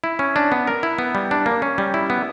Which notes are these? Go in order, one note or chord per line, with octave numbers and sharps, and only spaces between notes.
E4
C#4
D4
B3
A#4
E4
B3
G3
D4
A#3
C#4
G3
E4
B3